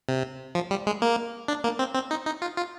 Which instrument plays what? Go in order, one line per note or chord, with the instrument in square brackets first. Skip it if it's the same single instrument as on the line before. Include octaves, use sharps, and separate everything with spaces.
[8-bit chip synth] C3
F3
G3
G#3
A#3
D4
A#3
C4
C4
D#4
D#4
F4
F4